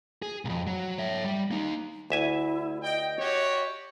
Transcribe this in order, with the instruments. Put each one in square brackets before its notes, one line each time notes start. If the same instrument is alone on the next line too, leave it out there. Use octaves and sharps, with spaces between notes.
[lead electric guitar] G#4
C2 F2
F#3
C#5 E5
G3
A#3 D#4
[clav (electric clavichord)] D2 E5 G#5 [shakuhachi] E4
[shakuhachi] D#5 [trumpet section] G5
[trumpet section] F#4 G4 C#5